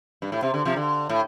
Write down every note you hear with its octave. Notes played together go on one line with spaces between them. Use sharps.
G2
A2
C3
D3
C3 F3
D3
A2